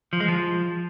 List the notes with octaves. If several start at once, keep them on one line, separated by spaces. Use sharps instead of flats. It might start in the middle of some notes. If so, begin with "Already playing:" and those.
F3
G#3
F3